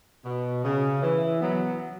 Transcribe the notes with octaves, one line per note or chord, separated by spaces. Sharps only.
B2
C#3
E3
F#3 B3